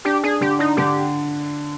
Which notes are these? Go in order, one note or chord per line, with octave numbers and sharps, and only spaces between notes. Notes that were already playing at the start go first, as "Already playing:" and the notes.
D4 G4
D4 G#4
D3 G4
D4 D#4
D3 G4